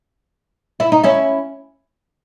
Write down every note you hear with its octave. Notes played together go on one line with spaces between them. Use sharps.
E4
D#4
C#4 E4